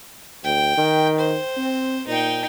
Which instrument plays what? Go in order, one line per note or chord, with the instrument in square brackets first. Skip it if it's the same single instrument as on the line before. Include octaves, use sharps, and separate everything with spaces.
[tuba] D2 [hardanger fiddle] G5
[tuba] D#3
[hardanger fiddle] C5
[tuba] C4
[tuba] A#2 [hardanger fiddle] D#4 G5